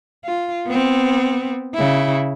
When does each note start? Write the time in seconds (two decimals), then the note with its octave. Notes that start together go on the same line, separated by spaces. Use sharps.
0.25 F4
0.67 B3 C4
1.75 C#3 E4